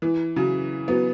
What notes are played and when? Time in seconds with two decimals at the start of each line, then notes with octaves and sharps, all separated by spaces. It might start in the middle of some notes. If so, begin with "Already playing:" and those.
0.02 E3
0.36 C#3 F#3
0.88 F#3 B3